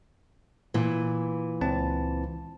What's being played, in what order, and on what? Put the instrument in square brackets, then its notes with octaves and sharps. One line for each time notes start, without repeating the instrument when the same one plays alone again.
[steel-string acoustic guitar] A#2 E3
[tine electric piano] C#2 C4 A5